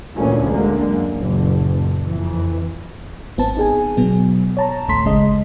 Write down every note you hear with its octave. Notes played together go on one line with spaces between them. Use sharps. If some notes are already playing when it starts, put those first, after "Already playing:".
D2 A#2 E3 C#4
D3 G#3 A#3
F#2
F#1 A#2
F2 E3
G#1 B3 C4 A5
D#4 G#4 G#5
B2 F#3 B3
C#5 A5 A#5
A1 D2 A3 C6 B6
G1 C#3 G#3 D#5